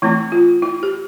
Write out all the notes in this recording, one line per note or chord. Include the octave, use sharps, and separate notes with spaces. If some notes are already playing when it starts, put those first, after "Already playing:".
E3 A3 C4 E4
F4
E4
G4